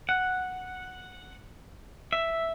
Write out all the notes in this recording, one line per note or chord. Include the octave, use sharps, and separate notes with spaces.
F#5
E5